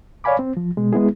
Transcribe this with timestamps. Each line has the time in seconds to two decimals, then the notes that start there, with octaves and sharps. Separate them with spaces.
0.24 C#5 D5 F5 G#5 B5 D6
0.39 C4
0.57 F3
0.77 B2 G#3
0.93 G#3 B3 E4 G#4